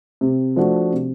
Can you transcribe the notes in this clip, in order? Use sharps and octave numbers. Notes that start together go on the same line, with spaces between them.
C3
F3 A3 D4 F#4
C3